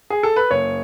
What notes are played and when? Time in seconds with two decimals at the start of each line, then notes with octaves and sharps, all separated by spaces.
0.10 G#4
0.23 A4
0.36 B4
0.51 F#1 C#5